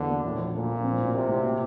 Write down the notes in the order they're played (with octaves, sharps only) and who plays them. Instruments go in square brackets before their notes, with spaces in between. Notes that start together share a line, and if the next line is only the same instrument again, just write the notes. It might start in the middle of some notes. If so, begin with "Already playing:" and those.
Already playing: [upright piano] E2 A3 [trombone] D3
[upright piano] A#3
[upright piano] A#1 [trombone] A2
[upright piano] A#1
[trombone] A#2 [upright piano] A3
[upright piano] A#1
C4
A2
[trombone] C3 [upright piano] C4
[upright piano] A2
A#2